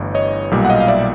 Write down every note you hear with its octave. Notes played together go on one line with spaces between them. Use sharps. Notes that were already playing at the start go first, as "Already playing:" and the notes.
Already playing: G1 G2 E3 A3
C#5 D#5
B1 A#2 G3
F#5
D#5 F5
F5
D5 E5